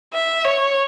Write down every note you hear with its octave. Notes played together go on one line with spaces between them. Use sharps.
E5
C#5